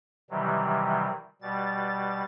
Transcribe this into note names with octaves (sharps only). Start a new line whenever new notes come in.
C3 D#3 E3 F#3 G3
B2 G3 A6